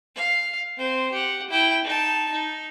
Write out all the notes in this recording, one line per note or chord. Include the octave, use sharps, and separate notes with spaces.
F5
C4 C5
G4 F#5
E4 G5
D#4 A5
D#4